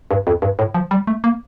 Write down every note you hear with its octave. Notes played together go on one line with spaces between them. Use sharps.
G2
F2
G2
A2
F3
G3
A3
A#3